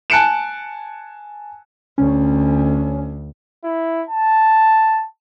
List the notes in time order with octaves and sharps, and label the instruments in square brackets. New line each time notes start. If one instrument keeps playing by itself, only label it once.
[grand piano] G#5 A5 F#6 C#7 D7 E7
[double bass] D2 [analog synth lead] C#4
[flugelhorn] E4
A5